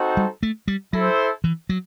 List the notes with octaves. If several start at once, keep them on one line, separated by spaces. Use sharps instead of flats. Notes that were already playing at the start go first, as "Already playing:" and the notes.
Already playing: C4 D#4 F#4 A4 C5
G3
A3
G3
F#3 E4 A4 C5
E3
F#3